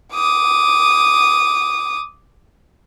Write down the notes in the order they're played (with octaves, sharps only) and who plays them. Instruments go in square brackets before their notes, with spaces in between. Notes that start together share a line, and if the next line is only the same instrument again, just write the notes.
[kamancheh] D6 D#6